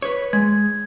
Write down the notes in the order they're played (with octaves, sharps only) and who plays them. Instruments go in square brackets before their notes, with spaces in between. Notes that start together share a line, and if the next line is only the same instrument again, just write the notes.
[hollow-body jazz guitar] B4 C#5
[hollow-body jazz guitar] G#3 [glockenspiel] G#6